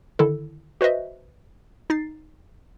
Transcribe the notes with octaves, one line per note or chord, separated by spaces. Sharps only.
D3 D#3 E4 A4
F#4 B4 C5 D#5 E5
D#4 A6 C7